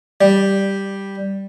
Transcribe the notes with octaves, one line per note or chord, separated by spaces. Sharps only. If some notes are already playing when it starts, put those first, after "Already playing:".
G3